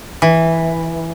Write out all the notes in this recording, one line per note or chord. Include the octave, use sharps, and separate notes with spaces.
E3